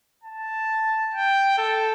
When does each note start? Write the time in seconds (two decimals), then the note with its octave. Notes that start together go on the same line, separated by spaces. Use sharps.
0.24 A5
1.14 G5
1.58 A4